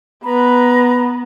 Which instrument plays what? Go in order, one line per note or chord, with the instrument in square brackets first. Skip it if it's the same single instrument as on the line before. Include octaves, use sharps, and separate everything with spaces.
[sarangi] B3 [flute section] B4 A#5 B5